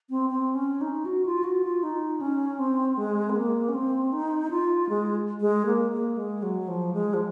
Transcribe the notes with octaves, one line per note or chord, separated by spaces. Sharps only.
C4
C4
C#4
D#4
F#4
F4
F#4
F4
D#4
C#4
C4
G#3
C4
A#3
C#4
C4
D#4
F4
G#3
G#3
A#3
A#3
G#3
F#3
F3
G#3
F3